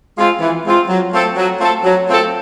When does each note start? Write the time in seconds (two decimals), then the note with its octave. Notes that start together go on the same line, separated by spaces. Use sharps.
0.17 G#3 C4 F4
0.40 E3
0.64 G#3 C4 F4
0.88 F#3
1.12 A3 C4 F4 A4
1.36 F#3
1.59 A3 C4 F4 A4
1.84 F#3
2.08 A3 C4 F4 A4